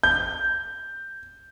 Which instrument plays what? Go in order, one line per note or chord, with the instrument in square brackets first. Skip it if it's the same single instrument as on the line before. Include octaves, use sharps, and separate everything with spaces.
[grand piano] G6